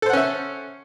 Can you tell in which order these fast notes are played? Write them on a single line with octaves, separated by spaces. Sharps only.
A4 C5 F#5 C#4 E5